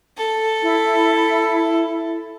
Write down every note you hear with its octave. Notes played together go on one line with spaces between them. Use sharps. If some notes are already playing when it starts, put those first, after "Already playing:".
A4
E4